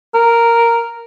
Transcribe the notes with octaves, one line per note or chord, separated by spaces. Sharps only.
A#4